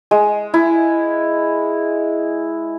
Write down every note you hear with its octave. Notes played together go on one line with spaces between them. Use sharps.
G#3
E4